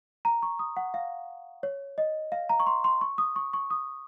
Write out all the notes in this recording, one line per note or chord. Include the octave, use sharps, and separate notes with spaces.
A#5
C#6
D#6
F#5
F5
C#5
D#5
F5
A#5
C#6
C6
C6
C#6
D#6
C#6
C#6
D#6